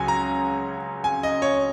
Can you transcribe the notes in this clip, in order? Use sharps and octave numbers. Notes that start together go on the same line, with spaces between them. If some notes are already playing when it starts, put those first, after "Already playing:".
Already playing: C#2 C#3 F#3 G#5
A#5
G#5
D#5
C#5